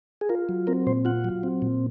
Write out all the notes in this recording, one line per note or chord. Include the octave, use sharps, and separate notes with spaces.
G#4
F4 A#4
F#3
C4 A#4
A#2 C5
F4 F#5
F#3
C4
A#2